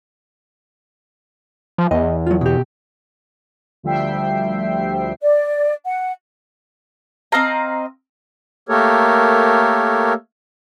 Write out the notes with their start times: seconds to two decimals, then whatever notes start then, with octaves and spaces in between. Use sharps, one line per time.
1.78 F3
1.91 E2 D#5
2.27 F#3 F4
2.41 B2 G4
3.83 D2 F3 G3 E5 G5 C7
5.22 D5
5.85 F#5
7.32 C4 D#5 F5 A#5
8.69 A3 A#3 G4 A4 A#4 C#5